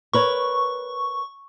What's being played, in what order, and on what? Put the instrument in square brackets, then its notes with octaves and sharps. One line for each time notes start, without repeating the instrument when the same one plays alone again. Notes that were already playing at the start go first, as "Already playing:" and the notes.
[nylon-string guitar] A#4 B4 C#5 [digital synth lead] C#6